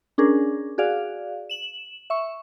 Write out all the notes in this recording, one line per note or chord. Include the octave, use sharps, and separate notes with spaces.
C#4 D4 G#4 A#4
F#4 G#4 D5 F5
E7 F#7
E5 C#6